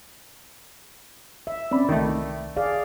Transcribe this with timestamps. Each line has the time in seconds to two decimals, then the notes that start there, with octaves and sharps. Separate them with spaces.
1.47 E5
1.72 C4 C#4 D5 B5
1.89 C2 D#3 A3
2.56 G#4 D5 F5